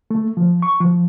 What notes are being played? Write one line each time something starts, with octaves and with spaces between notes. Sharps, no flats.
A3
F3
C#6
F3